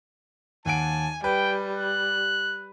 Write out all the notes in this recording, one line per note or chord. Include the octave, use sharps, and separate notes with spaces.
D#2 F#5 G#5 A5 D7
G3 B4 G5
F#6